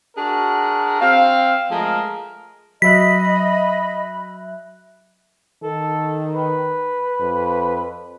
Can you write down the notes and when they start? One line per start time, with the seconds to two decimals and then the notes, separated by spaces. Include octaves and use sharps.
0.16 D4 F#4 G#4 A#4
1.01 C4 F5
1.71 F3 G#3 A3 G#4 A#4
2.82 F#3 D#5 E5 B5 F#6 B6
5.63 D#3 A4
6.35 B4
7.20 F2